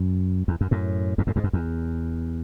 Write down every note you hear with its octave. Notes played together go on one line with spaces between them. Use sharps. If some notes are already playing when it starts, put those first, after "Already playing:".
Already playing: F#2
E2
F#2
F#2 A2
E2 G#2
F#2 A2
E2 G#2
F#2
E2